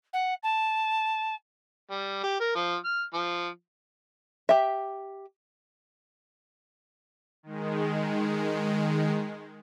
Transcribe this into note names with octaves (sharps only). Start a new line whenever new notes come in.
F#5
A5
G3
G4
A#4
F3
F6
F3
G4 E5
D#3 G#3